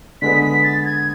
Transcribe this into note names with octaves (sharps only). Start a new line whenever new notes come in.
D3 G#3 B3 B6
B6
A6
A6
G#6